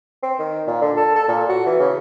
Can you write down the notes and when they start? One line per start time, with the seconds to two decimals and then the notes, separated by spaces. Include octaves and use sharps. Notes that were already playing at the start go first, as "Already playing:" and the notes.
0.23 C4
0.39 D#3
0.67 A#2
0.81 D3
0.97 A4
1.15 A4
1.28 A#2
1.49 F#4
1.66 E3
1.79 C#3